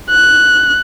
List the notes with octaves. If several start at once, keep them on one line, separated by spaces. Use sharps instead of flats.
F#6